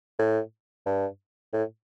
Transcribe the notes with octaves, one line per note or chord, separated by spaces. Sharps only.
A2
G2
A2